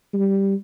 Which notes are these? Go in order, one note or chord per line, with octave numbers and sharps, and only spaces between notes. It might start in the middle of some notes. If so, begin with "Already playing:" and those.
G3